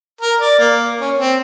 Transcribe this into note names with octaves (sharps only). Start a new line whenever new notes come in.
A#4
D5
A#3
C#4
C4